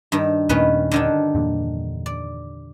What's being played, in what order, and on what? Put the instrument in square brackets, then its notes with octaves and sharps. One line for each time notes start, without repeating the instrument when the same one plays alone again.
[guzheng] G2 D#3
[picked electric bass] D#2 A#2 A3 [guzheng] D#3 C#4 B4
[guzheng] D3 D#3 D4
[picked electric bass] E2 G2 A#2
[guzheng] D5